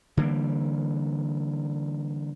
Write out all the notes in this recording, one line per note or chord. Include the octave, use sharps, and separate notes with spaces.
D3 E3 G3 A#3